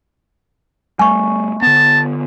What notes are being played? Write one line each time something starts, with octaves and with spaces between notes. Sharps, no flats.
G3 A3 G#5 C#6
D3 B3 A5